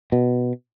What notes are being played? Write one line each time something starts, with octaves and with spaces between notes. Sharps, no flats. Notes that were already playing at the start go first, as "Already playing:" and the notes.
B2